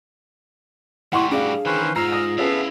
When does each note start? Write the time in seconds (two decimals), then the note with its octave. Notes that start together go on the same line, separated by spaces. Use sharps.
1.13 A2 G3 E4 F#5 C6 C#6
1.31 D4 F#4 G#4 F5 D6
1.66 D#3 E3 C#4 B4 C5
1.96 G#2 F4 A#5 E6 F6 A#6 C7
2.12 D#6 A#6
2.38 B3 C#4 E4 G#4 A4 B4 E5 F5